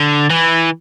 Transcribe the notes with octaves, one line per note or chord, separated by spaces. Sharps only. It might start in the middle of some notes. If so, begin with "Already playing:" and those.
Already playing: D3
E3